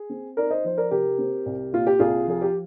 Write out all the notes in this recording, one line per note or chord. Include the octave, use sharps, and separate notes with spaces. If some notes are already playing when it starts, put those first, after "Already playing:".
Already playing: G#4
C4
D#4 A#4 D5
C5 D#5
F3 C5
A#4 D5
C3 G4 A#4
C4
C2
A#2 F4
G4
C2 F4 G#4
F3 G#4
G4